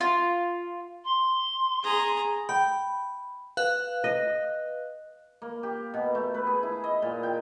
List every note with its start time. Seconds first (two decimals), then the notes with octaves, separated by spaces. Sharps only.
0.01 F4
1.04 C6
1.83 G#4 A#5
2.49 G5 B5
3.57 B4 F5 F#6
4.04 D#5
5.42 A#3
5.63 G4
5.94 B2
6.15 A3
6.34 B4
6.47 G#4
6.63 E4
6.84 D#5
7.02 A#2
7.23 G5